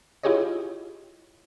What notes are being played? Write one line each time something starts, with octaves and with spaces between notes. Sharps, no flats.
E4 F4 G4 G#4 C#5 D#5